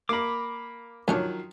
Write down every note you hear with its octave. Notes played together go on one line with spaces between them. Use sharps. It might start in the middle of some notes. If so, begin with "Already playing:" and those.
A#3 A#4 B5 D6
A2 D#3 F3 F#3 C#4 D4